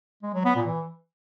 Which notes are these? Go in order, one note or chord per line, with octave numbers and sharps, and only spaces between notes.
G#3
F#3
B3
A#2
E3